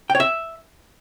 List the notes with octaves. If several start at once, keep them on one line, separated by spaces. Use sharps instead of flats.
G5
C#5
E5